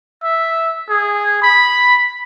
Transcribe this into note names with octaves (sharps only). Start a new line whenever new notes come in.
E5
G#4
B5